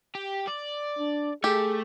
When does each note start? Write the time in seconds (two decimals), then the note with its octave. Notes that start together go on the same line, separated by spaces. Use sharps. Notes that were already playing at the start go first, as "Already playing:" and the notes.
0.15 G4
0.48 D5
0.98 D4
1.44 A3 G4 G#4